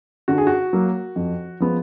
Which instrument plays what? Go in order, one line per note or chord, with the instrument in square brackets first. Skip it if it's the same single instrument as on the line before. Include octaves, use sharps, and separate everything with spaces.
[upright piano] D3 F#4
G#4
F#4
F#3 A#3
F2
F3 G#3 B3